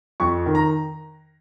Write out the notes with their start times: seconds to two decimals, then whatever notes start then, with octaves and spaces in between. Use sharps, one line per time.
0.20 F2 C#6
0.46 D#3
0.55 A#5